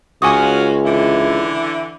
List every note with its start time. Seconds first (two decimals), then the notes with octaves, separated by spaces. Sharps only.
0.22 C#2 C#4 F4 F#4 G#5 D#6
0.85 D3 E3 E4